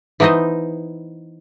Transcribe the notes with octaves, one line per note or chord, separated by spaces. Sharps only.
E3 B3 D#4 C5 D#5